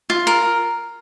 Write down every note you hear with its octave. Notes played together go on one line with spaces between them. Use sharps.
F4
A#4